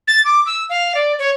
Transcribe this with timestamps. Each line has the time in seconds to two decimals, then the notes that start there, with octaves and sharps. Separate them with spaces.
0.08 A6
0.25 D6
0.46 E6
0.70 F5
0.95 D5
1.19 C#5